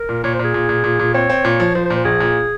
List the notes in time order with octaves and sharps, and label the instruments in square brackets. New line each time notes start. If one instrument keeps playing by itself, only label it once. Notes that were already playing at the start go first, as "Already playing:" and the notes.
Already playing: [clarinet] A#4
[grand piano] A#2
[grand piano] A#2 [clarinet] C#5
[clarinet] C5
[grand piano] A#2 [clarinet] G#4
[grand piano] A#2
A#2
A#2
A#2
[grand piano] C4 [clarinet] C#5
[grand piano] C4
A#2
F3
[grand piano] F3 [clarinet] C5
[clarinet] C5
[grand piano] A#2
[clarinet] C5
[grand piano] A#1 [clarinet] G#4
[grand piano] A#2